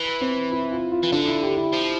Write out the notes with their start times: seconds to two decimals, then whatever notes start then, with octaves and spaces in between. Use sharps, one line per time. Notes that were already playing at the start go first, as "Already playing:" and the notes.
Already playing: E3
0.21 C4
0.52 E4
0.71 F4
0.92 F4
1.03 E3
1.12 D3 D4
1.28 E4
1.43 G4
1.57 E4
1.73 F3